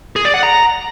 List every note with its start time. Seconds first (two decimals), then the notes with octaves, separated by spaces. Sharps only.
0.16 G#4
0.25 D5
0.34 F#5
0.43 A#5